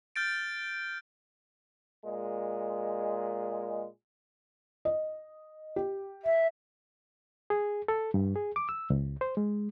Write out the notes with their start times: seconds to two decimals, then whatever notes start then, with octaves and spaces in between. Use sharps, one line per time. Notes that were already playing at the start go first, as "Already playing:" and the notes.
0.16 F6 G6 A6 D7
2.04 A#2 G#3
4.85 D#5
5.76 G4
6.25 E5
7.50 G#4
7.88 A4
8.14 G2
8.35 G#4
8.56 D6
8.69 E6
8.90 C#2
9.21 C5
9.37 G#3